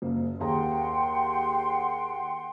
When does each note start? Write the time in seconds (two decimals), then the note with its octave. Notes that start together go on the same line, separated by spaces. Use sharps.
0.02 F#1 A#3
0.40 D#2 G#4 F#5 G5 A#5 C6